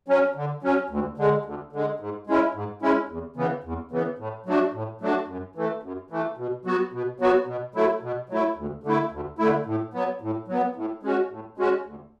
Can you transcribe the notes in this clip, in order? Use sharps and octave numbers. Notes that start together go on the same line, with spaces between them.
F#3 C#4
D3
F#3 C#4
D2
D3 G#3
D2
D3 G#3
G#2
G#3 C#4 E4
G#2
G#3 C#4 E4
E2
C#3 E3 B3
E2
C#3 E3 B3
A2
F#3 A3 D4 F#4
A2
F#3 A3 D4 F#4
F#2
E3 A3
F#2
E3 A3
B2
F#3 B3 F#4
B2
F#3 B3 F#4
B2
F#3 A3 E4
B2
F#3 A3 E4
D2
D3 A3 E4
D2
D3 A3 E4
A2
F#3 B3
A2
F#3 B3
A2
G#3 C#4 F#4
A2
G#3 C#4 F#4
D2